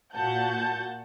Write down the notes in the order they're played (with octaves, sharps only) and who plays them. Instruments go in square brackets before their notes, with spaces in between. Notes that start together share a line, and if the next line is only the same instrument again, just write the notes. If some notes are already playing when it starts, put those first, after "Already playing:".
[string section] A#2 F#4 F#5 A5 G6